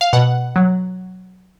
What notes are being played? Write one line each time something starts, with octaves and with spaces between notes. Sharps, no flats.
F5
B2 F#5
F#3